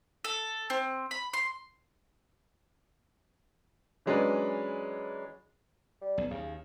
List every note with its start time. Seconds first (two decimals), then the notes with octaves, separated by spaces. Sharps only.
0.24 A4
0.70 C4
1.11 B5
1.33 C6
4.06 E3 F#3 G#3 C#4 D4 B4
6.01 G3
6.18 B1
6.31 D#2 C#3